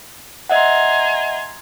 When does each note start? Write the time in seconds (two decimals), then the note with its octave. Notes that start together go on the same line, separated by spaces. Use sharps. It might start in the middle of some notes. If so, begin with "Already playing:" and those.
0.49 D#5 E5 F#5 G#5 A#5 C6